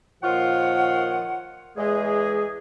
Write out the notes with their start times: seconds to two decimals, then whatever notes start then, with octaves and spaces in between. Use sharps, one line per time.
0.22 A#2 D#3 F3 F4 C#5 F#5
1.77 E2 G#3 G#4